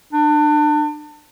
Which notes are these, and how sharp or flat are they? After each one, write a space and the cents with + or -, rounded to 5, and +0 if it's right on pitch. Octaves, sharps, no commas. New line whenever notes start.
D4 +30